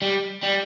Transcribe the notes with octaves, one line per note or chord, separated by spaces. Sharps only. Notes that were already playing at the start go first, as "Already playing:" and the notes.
G3
G3